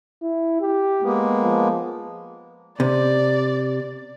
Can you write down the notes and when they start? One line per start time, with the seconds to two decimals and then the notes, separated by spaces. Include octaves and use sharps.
0.22 E4
0.60 G4
1.02 G#3 A#3 B3
1.42 F3
2.80 C3 D5